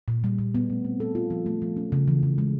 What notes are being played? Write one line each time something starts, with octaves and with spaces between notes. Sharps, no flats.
A#2
G3
A#2
B3
A3
C4
A4
F4
F3
A3
F3
C#4
C#3
E3
C#3
G#3